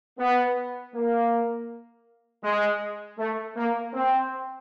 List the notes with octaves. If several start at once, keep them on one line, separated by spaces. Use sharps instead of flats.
B3
A#3
G#3
A3
A#3
C4